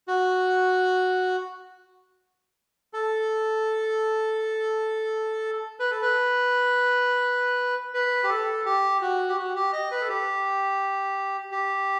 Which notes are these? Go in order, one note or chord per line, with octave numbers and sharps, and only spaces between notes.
F#4
A4
B4
A4
B4
B4
G4
A4
G4
F#4
G4
F#4
G4
D#5
B4
A4
G4
G4